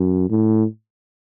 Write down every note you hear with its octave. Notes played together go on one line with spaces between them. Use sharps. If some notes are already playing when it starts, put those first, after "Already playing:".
Already playing: F#2
A2